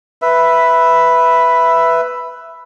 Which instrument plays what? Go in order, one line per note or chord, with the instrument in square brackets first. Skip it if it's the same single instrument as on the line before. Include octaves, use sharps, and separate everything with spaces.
[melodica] B4 E5